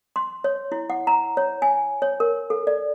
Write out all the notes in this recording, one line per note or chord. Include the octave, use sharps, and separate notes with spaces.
C6
C#5
E4
F#5
A#5
C#5
G#5
C#5
A#4
A4
D5